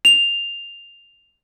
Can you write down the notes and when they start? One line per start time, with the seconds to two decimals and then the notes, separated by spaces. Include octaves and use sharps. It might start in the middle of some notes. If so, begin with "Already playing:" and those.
0.05 F7